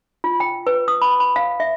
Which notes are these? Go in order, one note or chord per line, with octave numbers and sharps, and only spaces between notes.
F4
G5
B4
D#6
B5
B5
F5
E5